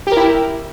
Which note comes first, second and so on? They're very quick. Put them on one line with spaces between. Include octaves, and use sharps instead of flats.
G4 A#4 E4